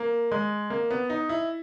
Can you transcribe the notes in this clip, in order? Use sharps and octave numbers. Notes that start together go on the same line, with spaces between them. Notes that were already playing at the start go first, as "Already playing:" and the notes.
Already playing: A#3
G#3
A#3
B3
D#4
E4